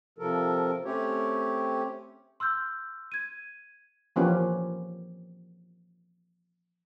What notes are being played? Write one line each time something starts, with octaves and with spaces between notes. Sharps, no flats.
C3 F3 A4 A#4
A3 C4 C#4 G4 C#5
C6 E6 F6 G6
G#6 D#7
E3 F3 A#3 C#4 G4 B4